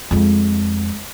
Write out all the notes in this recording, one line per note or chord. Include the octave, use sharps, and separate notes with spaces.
F2 G#3